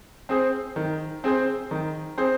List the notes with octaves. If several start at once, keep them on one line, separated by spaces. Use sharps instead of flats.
C4 G#4 C5
D#3
C4 G#4 C5
D#3
C4 G#4 C5